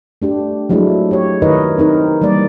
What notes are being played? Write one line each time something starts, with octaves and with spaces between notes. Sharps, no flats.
A3 D4 G4
F3 F#3 G#3 A3 D4 E4
G4 C#5
D#3 E4 A#4 B4 C#5 D#5
C4 D#4 A#4
E3 G3 A#3 D5